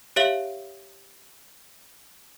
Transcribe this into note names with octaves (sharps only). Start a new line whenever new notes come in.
G4 C#5 E5 F5 F#7